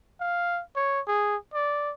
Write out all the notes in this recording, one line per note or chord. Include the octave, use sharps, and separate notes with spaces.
F5
C#5
G#4
D5